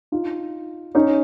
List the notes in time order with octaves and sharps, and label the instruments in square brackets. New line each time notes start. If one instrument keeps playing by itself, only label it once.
[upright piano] D#4 F4
C#4 D#4